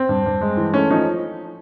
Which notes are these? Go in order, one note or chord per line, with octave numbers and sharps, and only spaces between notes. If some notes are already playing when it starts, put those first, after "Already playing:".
Already playing: C4
G2
G2
G#3
E3
A3 C#4
F3 C#4 D#4